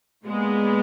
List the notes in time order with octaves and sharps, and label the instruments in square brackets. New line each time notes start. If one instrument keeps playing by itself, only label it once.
[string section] A#2 G#3 B3